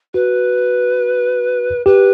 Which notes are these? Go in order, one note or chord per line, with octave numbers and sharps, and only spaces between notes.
F#4 B4
G4 B4